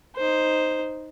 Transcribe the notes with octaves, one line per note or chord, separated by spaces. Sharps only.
D#4 C5